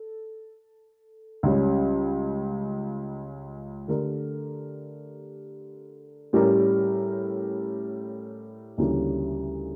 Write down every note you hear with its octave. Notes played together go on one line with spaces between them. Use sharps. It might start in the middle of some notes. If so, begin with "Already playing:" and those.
Already playing: A4
C#2 C#3 G3
D3 A3 D4 G4 A#4
A2 G3 C#4 G4 A#4
D2 C#3 E3 G3 A#3